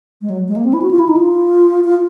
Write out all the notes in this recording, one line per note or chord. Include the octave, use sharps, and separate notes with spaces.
G#3
F#3
G#3
A#3
C4
E4
F#4
F4
E4
D#4
F4
F4